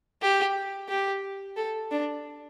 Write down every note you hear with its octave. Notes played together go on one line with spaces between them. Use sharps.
G4
G4
A4
D4